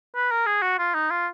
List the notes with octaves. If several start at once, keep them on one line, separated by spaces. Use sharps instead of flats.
B4
A#4
G#4
F#4
F4
D#4
F4